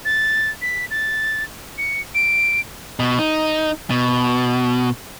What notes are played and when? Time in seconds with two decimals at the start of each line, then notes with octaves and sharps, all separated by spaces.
0.05 A6
0.62 B6
0.91 A6
1.78 C#7
2.15 D7
3.00 B2
3.19 D#4
3.90 B2